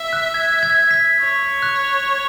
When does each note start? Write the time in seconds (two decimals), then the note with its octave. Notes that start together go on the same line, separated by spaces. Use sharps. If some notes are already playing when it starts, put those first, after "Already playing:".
Already playing: E5
0.13 F#6
0.34 G#6
0.63 G#6
0.91 B6
1.20 C#5
1.62 F#6